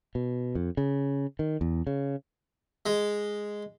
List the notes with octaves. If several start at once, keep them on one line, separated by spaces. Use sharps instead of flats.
B2
F2
C#3
D#3
E2
C#3
G#3